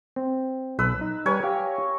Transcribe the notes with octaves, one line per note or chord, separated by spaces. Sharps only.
C4
B1 B4 E6
D#4
G3 A#4 B4 C#5 G#5
G4 F5